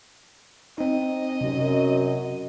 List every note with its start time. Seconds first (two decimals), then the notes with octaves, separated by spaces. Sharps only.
0.78 C4 D#4 D#5
1.41 F#2 C3